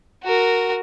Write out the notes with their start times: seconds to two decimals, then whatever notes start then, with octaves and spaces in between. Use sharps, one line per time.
0.24 F#4 A#4